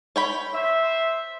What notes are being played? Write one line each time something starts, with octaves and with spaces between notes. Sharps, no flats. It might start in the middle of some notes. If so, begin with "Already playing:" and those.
C#5 G5 B5
C5 E5